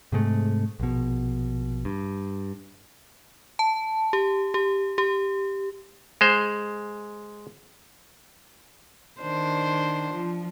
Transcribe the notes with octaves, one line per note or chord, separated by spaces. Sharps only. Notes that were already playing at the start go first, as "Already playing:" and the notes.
G#2 C3 G#3 A3
A#1 B2
G2
A5
G4
G4
G4
G#3 C5
D#3 D4 C5
F3